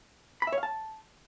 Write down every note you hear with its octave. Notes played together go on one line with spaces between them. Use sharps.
B5
E5
C#5
F5
A5